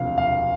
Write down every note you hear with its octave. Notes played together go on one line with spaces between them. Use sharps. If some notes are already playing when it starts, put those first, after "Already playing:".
Already playing: E1 D2 C3 F3 F5
F5